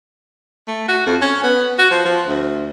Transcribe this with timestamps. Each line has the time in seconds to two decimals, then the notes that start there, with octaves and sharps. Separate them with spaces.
0.68 A3
0.88 F#4
1.06 F2
1.22 C#4
1.44 B3
1.78 F#4
1.91 F3
2.05 F3
2.27 D2